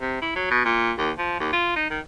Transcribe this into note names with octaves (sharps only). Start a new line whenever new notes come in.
C3
E4
F#3
B2
A#2
D#2
F3
D#2
F4
D#4
D#3